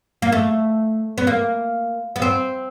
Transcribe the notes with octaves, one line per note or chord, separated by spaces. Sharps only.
A#3
A3
B3
A#3
B3
C4